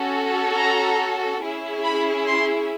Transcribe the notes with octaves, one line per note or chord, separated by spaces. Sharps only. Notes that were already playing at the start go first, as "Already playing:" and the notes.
Already playing: C#4 F#4 A4
A#5
C#4 E4 G#4
B5
C6